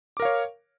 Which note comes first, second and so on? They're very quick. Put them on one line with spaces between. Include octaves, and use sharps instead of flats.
D6 A#4 F5 C#5